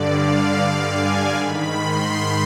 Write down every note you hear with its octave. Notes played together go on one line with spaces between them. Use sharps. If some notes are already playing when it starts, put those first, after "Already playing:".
Already playing: G2 D3 D5
F5
G#5
G#2 D#3 B5
C6